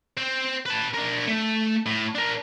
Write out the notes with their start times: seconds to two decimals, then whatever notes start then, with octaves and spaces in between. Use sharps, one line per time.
0.17 C4
0.66 B4 A5
0.94 D4 A#4
1.28 A3
1.86 A2
2.15 D4 A#4